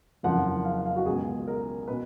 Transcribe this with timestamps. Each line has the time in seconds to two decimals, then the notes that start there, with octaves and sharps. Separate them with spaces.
0.23 F#1 F2 F3 F#5
0.65 F5
0.86 F5
0.96 F#4
1.06 C#2 B2 G#4
1.47 A#4
1.88 B2 B4